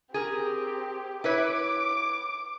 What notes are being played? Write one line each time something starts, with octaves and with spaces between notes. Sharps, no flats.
C4 G4 G#4 A#4
E4 B4 C#5 D6